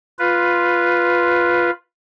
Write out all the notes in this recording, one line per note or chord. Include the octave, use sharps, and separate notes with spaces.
F4 B4